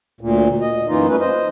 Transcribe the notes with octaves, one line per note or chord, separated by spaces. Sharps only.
D2 A#2
D#5
F#2 E3 A#3 D#4 F4
G3 A3 C#4 B4
C5 D#5